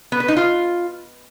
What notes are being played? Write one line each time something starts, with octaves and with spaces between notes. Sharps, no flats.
B3
B4
D#4
F4